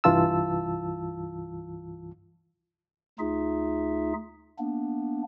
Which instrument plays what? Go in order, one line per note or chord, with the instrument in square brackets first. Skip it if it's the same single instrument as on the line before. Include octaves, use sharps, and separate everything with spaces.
[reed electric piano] C2 G2 E3 F4 A5 E6
[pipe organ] D2 A3 D#4 F4 G#4 E5
A#3 B3 D4